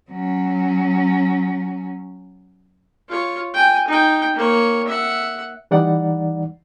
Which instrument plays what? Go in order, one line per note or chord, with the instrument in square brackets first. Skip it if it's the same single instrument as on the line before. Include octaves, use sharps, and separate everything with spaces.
[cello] F#3 C#4
[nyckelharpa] F4 C#5
G5 G#5
D#4 G5
A#3 C#5
E5 F#5
[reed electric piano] E3 G3 D#4 D5 F#5